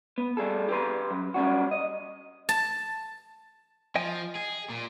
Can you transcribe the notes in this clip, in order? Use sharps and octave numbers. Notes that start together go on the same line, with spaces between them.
B3
G3 G#4 A4
G4 B4 C6
F#2
G3 C#4 D4 F#4
D#5
A5
F3 D#5 G5 G#5
G#4
A#2